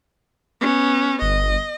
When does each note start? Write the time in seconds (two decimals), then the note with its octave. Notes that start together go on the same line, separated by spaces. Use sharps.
0.61 B3 C#4
1.22 G1 D#5